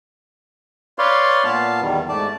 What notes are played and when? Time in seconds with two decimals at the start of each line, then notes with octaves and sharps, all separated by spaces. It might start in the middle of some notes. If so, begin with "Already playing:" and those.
0.98 B4 C#5 D5 F5 C6
1.44 A#2 B3 F5 A5
1.82 E2 D#3 G3
2.09 G#2 A3 D5 A5